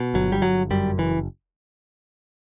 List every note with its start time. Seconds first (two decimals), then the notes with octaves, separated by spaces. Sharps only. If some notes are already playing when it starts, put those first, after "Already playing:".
Already playing: B2
0.14 G1 F#3
0.32 G3
0.42 G1 F#3
0.70 F#2 G3
0.98 F#1 E3